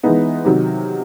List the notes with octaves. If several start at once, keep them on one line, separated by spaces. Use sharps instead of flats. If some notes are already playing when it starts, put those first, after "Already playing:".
E3 G#3 B3 D#4
C3 D#3 F#3